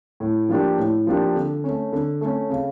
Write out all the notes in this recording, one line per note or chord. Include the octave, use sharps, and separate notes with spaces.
A2
F3 A#3 D4 G4
A2
F3 A#3 D4 G4
D3
A3 C#4
D3
A3 C#4
C#3